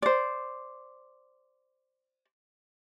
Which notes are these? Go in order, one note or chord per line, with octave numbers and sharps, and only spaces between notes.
C5 D5